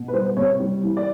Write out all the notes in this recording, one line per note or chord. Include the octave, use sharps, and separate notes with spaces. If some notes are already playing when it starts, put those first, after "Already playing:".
Already playing: B2
B4
G3 C5
C3 C#5
G3
E3
D5